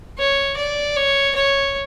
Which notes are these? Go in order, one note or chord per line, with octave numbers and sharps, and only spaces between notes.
C#5
D5
C#5
C#5